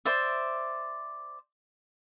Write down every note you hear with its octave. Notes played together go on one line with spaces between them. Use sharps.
C5 D5 E5